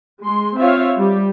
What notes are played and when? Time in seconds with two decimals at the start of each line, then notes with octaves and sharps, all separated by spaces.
0.23 G#3 C6
0.58 C4 F4 C#5 E5 F5
0.98 G3 G4